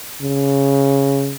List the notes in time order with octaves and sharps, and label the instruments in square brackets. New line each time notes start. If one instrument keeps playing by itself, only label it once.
[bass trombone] C#3